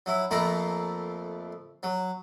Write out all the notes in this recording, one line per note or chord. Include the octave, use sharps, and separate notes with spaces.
F#3 E4
F2 F3 A3 A#3 A#5 B5
F#3